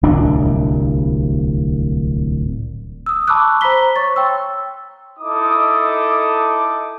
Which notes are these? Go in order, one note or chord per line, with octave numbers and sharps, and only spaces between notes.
D1 C2 A#2 D4
D#6 E6
A5 B5 C#6 D6 E6 F#6
C5 A#5 B5 B6 G7
C#5 C#6 A6
G5 C6 E6
D#4 E4 A4 D6 D#6